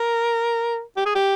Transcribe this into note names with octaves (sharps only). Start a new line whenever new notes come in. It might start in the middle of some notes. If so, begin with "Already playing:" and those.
Already playing: A#4
G4
G#4
G4